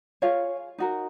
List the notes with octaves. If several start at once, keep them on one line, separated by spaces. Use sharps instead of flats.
F4 G#4 C#5 F5
D#4 F#4 A#4